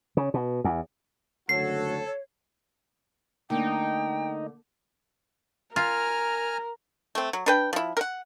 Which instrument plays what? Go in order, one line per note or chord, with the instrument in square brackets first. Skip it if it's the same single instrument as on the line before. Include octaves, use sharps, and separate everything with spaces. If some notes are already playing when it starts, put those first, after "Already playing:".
[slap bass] C#3
B2
E2
[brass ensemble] F#1 D2 F#4 [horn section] A4 [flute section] C#5 [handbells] C7
[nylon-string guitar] D3 A3 A#3 [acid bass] D#4 [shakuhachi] G5
[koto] F4 [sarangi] A#4 [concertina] G#5 A#5 F6
[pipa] A3 C4
F#3
D4 B4 G5
F3 E4
A#4 F#5